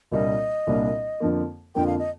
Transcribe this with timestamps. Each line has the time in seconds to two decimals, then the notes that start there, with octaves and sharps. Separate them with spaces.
0.12 C2 A#2 G3 A#3 D4 D#5
0.67 C2 A#2 G3 A#3 D4
1.20 F2 D3 F3 A#3
1.75 F2 D3 F3 A#3 G5
1.86 F5
1.98 D#5